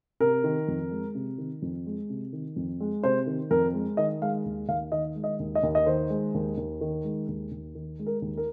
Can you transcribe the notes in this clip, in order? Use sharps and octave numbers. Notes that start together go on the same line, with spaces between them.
C3 A#4
D#3
F2
G#3
C3
D#3
F2
G#3
C3
D#3
F2
G#3
C3 C5
D#3
F2 A#4
G#3
D#3 D#5
G#3 F5
D#2
D#2 F5
D#3 D#5
G#3
D#5
D#2
D#5
D#2
D#5
D#3 C5
G#3
D#2
D#2
D#3
G#3
D#2
D#2
D#3
G#3
A#4
D#2
A#4